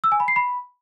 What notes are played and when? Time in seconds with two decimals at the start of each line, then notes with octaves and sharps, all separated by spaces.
0.04 E6
0.12 G#5
0.20 B5
0.28 C7
0.36 B5